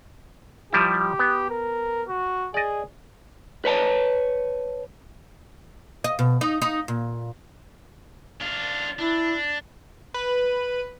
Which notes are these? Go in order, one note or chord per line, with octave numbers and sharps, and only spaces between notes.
F3 G3 E4 G4
B3
A#4
F#4
G#4 D5 D#5
B4 C#5 A5
D#5
B2
D#4
D#4
A#2
D4 F4
D4 E4
B4